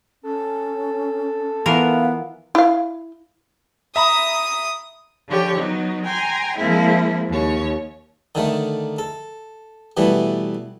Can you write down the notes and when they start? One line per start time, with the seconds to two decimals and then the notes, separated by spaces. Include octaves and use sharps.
0.23 C#4 A4
1.66 E3 B3 F4 A#4 F5
2.55 E4 F5
3.96 E5 A#5 B5 D#6
5.28 D3 F3 G4 C#5
5.58 F#3 B3 D#4
6.05 G5 G#5 A#5 C6
6.58 F3 G#3 A#3 C4 E4
7.28 D#2 C#5
8.35 D3 D#3 A3
8.99 A4
9.97 B2 E3 G3 A3